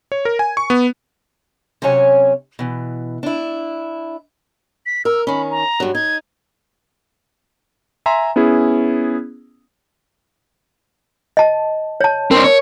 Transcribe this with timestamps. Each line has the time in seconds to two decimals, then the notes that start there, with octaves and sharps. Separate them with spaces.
0.12 C#5
0.25 A#4
0.39 G#5
0.57 C#6
0.70 B3
1.82 C3 F#3 C#4 C#5 G#5
2.59 B2 E3
3.23 D4 E4
4.86 B6
5.05 A#4 E6
5.27 D#3 C#4 B5
5.51 A#5
5.80 G2 F#3
5.95 D#4 G#6
8.06 E5 G#5 A#5 C6
8.36 B3 C#4 E4 G#4
11.37 D#5 A5
12.01 C#5 A5
12.31 C4 D4 A#4
12.44 C#5